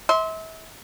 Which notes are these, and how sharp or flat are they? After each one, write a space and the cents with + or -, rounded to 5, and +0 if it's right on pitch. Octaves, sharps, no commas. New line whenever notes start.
E5 -35 C6 +0